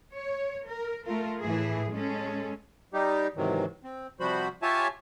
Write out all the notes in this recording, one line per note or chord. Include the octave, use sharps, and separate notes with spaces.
C#5
A#4
A3 F4 A#4
A2 E3 E4 G#4
G#3 C#4 A4
G3 D#4 G4
G#2 C3 D#3 E3 F#3
C4
C3 F3 G3 F#4 C5 B5
F4 G4 C#5 E5 G#5 A5